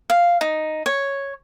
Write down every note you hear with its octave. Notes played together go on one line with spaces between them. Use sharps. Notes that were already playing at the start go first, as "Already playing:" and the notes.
F5
D#4
C#5